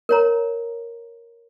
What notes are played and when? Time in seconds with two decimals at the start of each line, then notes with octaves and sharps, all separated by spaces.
0.09 A#4 C#5 A#5